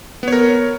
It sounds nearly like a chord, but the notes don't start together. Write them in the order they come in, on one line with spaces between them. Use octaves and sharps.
B3 C#5 A#4